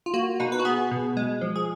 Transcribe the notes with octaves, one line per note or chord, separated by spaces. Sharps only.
F4
A#3 F#4
B2 D#4
B4
F#4
B3 G#4
B2
G#3
F3
G#4